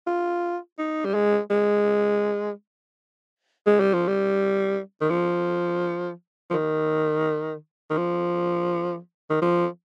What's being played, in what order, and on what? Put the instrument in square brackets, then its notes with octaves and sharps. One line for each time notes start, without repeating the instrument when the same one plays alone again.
[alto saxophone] F4
D#4
G3
G#3
G#3
G#3
G3
F3
G3
D#3
F3
F3
D#3
D#3
F3
D#3
F3